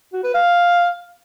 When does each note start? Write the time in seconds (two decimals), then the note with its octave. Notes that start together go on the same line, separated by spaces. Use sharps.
0.13 F#4
0.23 B4
0.34 F5